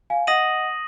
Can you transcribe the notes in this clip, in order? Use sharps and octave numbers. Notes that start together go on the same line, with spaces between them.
F5 G#5
D#5 F#5 D#6 A#6 D#7 F#7